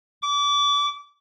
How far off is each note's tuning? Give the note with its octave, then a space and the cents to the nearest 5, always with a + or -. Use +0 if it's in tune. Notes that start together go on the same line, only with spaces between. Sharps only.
D6 -25